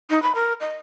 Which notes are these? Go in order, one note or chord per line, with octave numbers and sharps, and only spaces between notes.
D#4
B5
A#4
D#5